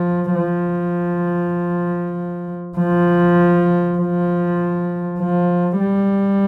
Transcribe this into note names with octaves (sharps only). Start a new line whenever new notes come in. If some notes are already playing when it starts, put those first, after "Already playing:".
Already playing: F3
F3
F3
F3
F3
G3